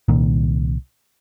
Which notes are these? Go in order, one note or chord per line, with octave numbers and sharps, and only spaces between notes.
C2 A#2 D#3 A#3